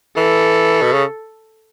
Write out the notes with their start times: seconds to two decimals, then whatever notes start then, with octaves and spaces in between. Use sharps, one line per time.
0.16 E3 A4
0.82 B2
0.93 C#3